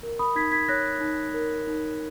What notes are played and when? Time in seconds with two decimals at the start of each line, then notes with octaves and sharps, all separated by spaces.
0.03 A#4
0.19 B5 D#6
0.36 D#4 G#6 B6
0.52 G#6 B6
0.68 C#5 F#6 A#6
1.01 D#4
1.34 A#4
1.67 D#4